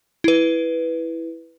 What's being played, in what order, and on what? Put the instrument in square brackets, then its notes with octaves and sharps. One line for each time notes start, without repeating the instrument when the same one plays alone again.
[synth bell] E4 B4